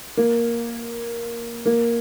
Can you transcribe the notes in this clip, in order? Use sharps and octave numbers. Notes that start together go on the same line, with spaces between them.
A#3
A#3